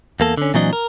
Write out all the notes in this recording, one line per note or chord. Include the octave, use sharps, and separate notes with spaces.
E2 A#3 A4
D3 C#4
A#2 E3 F#3 C4 D4 D#5
A#4